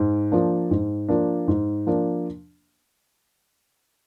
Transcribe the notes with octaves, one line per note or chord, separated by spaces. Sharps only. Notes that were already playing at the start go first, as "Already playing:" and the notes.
Already playing: G#2
F3 A#3 D4
G#2
F3 A#3 D4
G#2
F3 A#3 D4